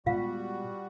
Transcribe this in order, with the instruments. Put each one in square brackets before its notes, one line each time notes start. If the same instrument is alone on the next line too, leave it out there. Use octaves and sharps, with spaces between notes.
[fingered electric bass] A#2 G#3 B3 [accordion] G3 F#4 [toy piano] F4 F5